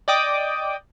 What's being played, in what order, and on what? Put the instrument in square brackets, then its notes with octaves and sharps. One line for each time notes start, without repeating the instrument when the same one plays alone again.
[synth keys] D5 D#5 G5 D6 D#6